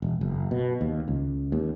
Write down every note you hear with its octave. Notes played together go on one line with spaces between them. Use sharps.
E1
F#1
B2
D#2
C#2
D#2